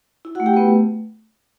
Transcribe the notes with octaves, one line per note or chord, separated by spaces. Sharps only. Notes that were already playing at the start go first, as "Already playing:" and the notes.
E4
A3 F#4 F#5
G4 G5
A3 B3 B4